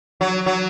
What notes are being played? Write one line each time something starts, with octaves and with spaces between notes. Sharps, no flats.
F#3
F#3